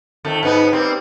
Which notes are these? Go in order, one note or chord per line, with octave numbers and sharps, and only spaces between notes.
F2 D#3 A3
G#2 B3 D#4
G3 A#3 C4